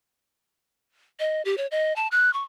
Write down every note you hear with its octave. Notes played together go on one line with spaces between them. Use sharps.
D#5
G4
C#5
D#5
A5
F#6
C#6